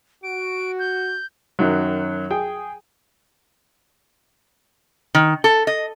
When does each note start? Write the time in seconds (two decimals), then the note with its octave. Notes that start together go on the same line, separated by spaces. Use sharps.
0.23 F#4 D7
0.79 G6
1.59 F#2 D#3 F#3
2.31 G#4 G5
5.15 D#3
5.44 A4
5.67 D#5